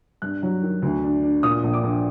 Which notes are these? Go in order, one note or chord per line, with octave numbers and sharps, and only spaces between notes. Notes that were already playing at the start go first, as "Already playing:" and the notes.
G2 F#6
F#3
D#3
D2
D4
D4
A#2 D#6
A#1
D6
A#1